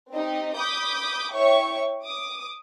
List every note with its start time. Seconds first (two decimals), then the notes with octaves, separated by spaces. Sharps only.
0.12 C4 D#4 G4 D#5
0.56 B5 D6 D#6 G6
1.33 E4 C#5 E5 G5 C#6
2.05 D6 D#6